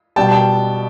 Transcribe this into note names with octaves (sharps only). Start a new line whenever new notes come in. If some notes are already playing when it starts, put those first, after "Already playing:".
B2 G3 G5 A5
G5 A5